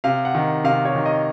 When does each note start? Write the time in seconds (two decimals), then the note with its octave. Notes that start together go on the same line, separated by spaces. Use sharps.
0.04 C3 F5
0.25 F#5
0.35 D#3
0.64 C3 F5
0.85 C#5
0.95 D#3
1.06 D#5